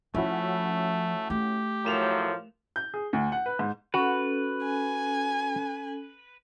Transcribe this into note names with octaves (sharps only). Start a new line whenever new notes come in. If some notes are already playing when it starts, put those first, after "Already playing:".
F3 A3 C#4 E4 F#4
A3 G4
A2 F3 F#3 A#4 E7 F7
G6
G#4
D2
F#5
B4
G#2
C#4 F#4 A4 B4
G#5